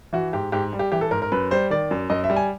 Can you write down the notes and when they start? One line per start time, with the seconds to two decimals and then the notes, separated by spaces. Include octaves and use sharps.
0.13 E3 F#4
0.33 G#2 G4
0.52 G#2 G4
0.73 G3
0.79 G4
0.92 E3 G4
1.01 A4
1.11 G#2 A#4
1.22 A#4
1.32 F#2 B4
1.51 G3 C5
1.70 D#3 D5
1.91 F#2
2.10 F#2 D#5
2.24 E5
2.30 G3
2.36 G#5